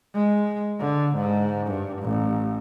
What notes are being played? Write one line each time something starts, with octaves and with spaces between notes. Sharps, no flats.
G#3
D3
G#2
G2
A1